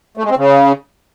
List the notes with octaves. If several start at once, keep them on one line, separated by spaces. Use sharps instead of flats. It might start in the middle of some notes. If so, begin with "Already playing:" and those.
A3
G#3
C4
C#3